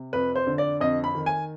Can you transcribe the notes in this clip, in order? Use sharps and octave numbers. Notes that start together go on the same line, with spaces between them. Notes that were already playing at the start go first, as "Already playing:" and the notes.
Already playing: C3
F2 B4
C5
D3
D5
F2 D#5
B5
D#3
G#5